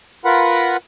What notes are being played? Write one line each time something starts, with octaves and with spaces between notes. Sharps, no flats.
F4 A#4 B4 F#5 B5